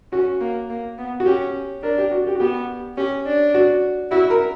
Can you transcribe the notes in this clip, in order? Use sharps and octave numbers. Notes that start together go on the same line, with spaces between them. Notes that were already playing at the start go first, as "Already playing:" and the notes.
C#4 F#4
A#3
A#3
B3
F#4
C#4 G4
D4 A#4
G4
F#4
G4
F#4
B3 G4
C#4 G4
D4
F#4
E4 F#4
A#4